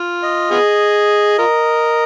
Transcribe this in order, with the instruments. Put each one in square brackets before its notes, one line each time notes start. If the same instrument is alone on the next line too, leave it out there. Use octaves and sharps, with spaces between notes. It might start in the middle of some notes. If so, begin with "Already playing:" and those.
Already playing: [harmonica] F4
[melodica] D#5
[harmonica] B3 F4 G#4
F4 A#4